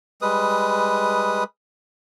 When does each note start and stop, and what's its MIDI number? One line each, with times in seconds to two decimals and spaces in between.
0.22 1.44 55
0.22 1.44 56
0.22 1.44 71
0.22 1.44 87